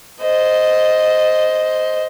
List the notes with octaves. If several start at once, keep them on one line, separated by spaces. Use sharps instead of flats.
C5 D#5